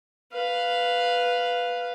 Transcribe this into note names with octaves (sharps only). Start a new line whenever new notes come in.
B4 F5